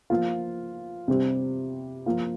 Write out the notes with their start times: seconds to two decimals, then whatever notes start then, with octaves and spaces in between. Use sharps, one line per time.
0.10 F3 A#3 F4
1.08 C3 G3 C4 G4
2.06 F3 A#3 F4